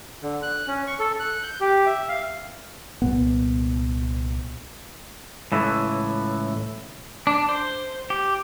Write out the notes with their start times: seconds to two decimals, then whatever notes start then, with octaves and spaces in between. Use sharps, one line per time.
0.23 D3
0.42 F#6
0.67 C#4
0.87 C#6
0.99 A4
1.20 F#6
1.43 G6
1.61 G4
1.86 E5
2.09 F5
3.02 C2 A#2 B3
5.52 C#2 A2 E3
7.27 D4
7.49 C5
8.10 G4